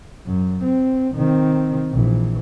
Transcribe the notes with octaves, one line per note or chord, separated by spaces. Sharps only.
F#2
C4
D#3 C4
A#1 E3